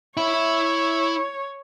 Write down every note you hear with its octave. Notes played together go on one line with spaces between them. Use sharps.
E4 C#5 E5